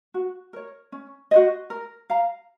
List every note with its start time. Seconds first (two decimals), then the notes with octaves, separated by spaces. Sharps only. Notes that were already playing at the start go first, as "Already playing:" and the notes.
0.14 F#4
0.53 A#4 C#5
0.92 C#4
1.31 F#4 C5 D#5
1.70 A#4
2.10 F5 A#5